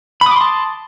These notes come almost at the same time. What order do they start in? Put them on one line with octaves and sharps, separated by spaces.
B5 D#6 D6 C6 A5